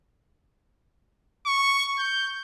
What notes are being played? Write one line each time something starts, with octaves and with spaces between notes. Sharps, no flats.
C#6
G6